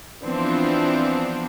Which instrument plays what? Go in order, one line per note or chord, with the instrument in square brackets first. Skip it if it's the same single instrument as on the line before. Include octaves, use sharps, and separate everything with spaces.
[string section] E3 F3 B3 C4 D4